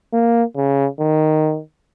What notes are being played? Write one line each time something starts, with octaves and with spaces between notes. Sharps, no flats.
A#3
C#3
D#3